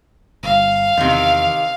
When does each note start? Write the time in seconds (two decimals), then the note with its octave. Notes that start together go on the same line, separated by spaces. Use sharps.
0.43 G1 F5
0.97 E2 C3 D#3